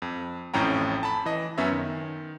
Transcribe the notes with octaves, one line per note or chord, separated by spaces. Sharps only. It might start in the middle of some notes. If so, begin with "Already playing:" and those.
F2
A1 F2 A2 C#4 G5 A#5
A5 B5
E3 D#5
F#2 B3 C#4 C#5 E5
D#3